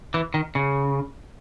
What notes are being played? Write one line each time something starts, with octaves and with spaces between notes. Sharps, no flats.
E3
D#3
C#3